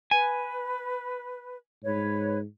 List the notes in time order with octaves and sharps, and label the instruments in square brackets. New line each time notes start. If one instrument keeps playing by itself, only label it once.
[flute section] B4 [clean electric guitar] G#5
[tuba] G#2 [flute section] B4 C#5